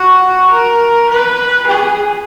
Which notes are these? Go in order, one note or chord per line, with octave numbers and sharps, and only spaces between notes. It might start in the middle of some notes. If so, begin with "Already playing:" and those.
Already playing: F#4
A#4
B4
G#4